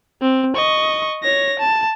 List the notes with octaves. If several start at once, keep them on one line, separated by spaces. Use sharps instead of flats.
C4
D#5 C#6
C#5 A#6
A5